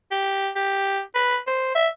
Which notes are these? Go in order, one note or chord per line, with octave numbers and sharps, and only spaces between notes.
G4
G4
B4
C5
E5